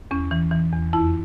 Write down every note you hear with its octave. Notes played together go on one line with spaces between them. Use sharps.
E2 C#4
E3
E3
E2
F2 E4